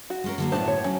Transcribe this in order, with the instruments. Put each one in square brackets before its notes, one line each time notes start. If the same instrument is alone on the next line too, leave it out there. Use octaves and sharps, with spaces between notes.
[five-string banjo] F#4
[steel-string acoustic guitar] G#3 C#4 A#4
D3 F#3 A#3
[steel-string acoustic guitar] F#2 A2 A5 [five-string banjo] B3 D4 C5
[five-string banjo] C#5
[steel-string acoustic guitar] F#3 [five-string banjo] C#4